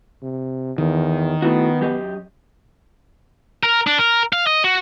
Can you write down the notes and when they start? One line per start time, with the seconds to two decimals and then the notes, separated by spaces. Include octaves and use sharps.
0.23 C3
0.78 E2 D#3
1.42 A3 B3 E4 F#4
1.81 F#2 G4 D#5
3.63 A#4
3.87 D4
3.99 A#4
4.33 F5
4.47 D#5
4.64 F#4